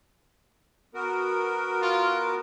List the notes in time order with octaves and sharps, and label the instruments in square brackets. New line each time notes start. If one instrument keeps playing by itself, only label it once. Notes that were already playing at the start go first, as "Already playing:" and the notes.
[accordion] B3 F#4 A#4
[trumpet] F4